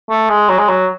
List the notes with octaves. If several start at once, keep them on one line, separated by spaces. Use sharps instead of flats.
A3
G#3
F#3
G#3
F#3